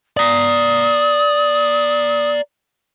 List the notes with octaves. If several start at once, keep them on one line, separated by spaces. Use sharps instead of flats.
D5 A#5 D#6